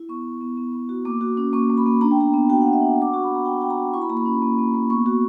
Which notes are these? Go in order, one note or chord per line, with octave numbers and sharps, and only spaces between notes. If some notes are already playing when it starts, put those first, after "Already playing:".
Already playing: E4
B3 C#6
B3
B3
B3
B3
F#4
A#3 D6
F#4
C#4
A#3 C#6
A#3
B5
A#3
D4 A#5
G5
B3 A#5
B3
F#4 G5
B3 F#5
E5
D4 F#5
F#4 D6
F#4 C#6
B5
B3
A#5
F#4 G5
F#4 G5
A#5
F#4
E4 C#6
B5
A#3 A#5
B5
C#4
A#3
A#3
A#3
B3 C#6
F#4